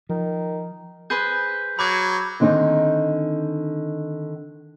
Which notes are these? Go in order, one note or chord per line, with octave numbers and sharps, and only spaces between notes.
D#3 F3
G#4 B4 C5 G6
F#3 B5 D6 G#6
D3 D#3 C4 D#4 G#4